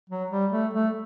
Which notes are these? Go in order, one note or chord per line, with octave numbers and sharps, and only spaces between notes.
F#3
G3
A3
A3